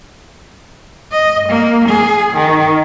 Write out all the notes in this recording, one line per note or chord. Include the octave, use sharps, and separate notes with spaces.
D#5
A#3
G#4
D#3